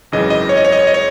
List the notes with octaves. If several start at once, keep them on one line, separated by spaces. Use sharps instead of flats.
G#1 F#2 C#3 E3 D#5
D#5
C#5
D#5
C#5
D#5
C#5
D#5
C#5